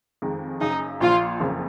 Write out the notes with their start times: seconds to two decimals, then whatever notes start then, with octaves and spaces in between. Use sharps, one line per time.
0.22 F2 D#3 G#3
0.61 F#1 F#2 C#3 D#4
1.00 A#1 A#2 F3 F4
1.40 F#1 F2 C#3 F3 A#3